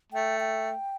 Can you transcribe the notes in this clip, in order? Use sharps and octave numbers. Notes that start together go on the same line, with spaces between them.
A3 G5
G5